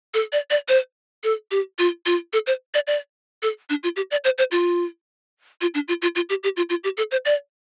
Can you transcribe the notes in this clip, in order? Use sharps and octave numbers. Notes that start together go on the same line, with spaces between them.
A4
D5
D5
C5
A4
G4
F4
F4
A4
C5
D5
D5
A4
D4
F4
G4
D5
C5
C5
F4
F4
D4
F4
F4
F4
G4
G4
F4
F4
G4
A4
C5
D5